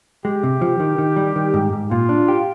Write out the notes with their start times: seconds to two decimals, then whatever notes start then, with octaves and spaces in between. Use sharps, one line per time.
0.25 G#3 G4
0.43 C3
0.61 F3
0.80 D#3
0.98 D#3
1.16 G3
1.36 D#3
1.54 G#2
1.73 G#2
1.91 A#2 F4
2.09 D4
2.28 G4